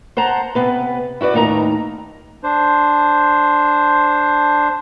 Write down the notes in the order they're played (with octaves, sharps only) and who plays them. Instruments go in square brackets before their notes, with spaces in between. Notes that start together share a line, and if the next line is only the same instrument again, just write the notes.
[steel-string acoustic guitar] C5 F#5 A5 A#5
C3 B3 B4
E4 F#4 B4 D5
D#2 A2 D#4 A#4 A#5
[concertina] D4 C5